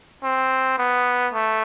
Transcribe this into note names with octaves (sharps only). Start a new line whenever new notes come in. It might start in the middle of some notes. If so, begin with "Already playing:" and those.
C4
B3
A3